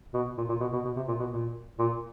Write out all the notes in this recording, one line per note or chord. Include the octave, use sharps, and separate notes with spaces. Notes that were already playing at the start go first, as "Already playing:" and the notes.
B2
A#2
A#2
B2
B2
B2
C3
A#2
B2
A#2
A#2